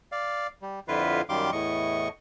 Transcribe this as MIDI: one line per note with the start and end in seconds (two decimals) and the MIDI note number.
0.12 0.47 74
0.12 0.47 77
0.62 0.80 55
0.88 1.21 41
0.88 1.21 50
0.88 1.21 64
0.88 1.21 65
0.88 1.21 71
0.88 1.21 77
1.29 1.51 42
1.29 1.51 51
1.29 1.51 55
1.29 1.51 77
1.29 1.51 84
1.29 1.51 86
1.52 2.08 40
1.52 2.08 45
1.52 2.08 75
1.52 2.08 85